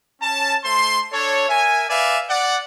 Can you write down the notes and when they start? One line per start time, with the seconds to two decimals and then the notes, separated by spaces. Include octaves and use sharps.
0.22 C#4 A5
0.64 A3 C5 C6
1.13 D4 A4 C#5
1.49 A#4 E5 G#5
1.90 B4 D5 E5 F5 G#5
2.29 D5 F#5